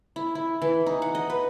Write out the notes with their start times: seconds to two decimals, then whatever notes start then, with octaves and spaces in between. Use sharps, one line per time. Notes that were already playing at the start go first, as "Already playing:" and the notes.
0.16 E4
0.35 E4
0.62 E3
0.86 D#4
1.02 F#5
1.15 D#5
1.30 B4